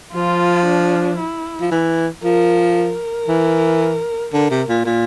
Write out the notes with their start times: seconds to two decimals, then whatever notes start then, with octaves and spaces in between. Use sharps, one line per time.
0.14 F3 F4
0.66 D4
1.18 E4
1.61 F3
1.71 E3
2.23 F3 A#4
2.76 A#4
3.28 E3
4.33 D3 A#4
4.50 C3
4.69 A#2
4.86 A#2